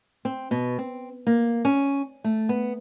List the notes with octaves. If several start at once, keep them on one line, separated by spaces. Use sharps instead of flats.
C4
B2
C4
A#3
C#4
A3
B3